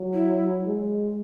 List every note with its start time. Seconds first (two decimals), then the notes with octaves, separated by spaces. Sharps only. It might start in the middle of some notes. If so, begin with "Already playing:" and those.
Already playing: F#3
0.13 E4
0.66 G#3